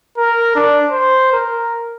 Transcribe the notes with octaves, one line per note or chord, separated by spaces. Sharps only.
A#4
D4
C5
A#4